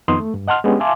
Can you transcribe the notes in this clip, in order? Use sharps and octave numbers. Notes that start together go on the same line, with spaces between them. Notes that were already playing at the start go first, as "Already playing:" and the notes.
F2 D#3 B3 D#4 C6 D#6
A3
G2
D#5 F#5 A5 C6 F6
G#3 B3 C#4 D4 G4
E5 F5 G#5 A5 C6 D6